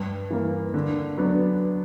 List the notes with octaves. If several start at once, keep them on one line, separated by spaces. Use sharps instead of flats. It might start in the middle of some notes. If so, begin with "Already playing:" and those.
Already playing: G2
E3 A#3
D3
F#3 B3 D4